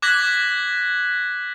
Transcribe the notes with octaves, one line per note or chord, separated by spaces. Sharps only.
D6 F#6 G#6 A#6 B6 F#7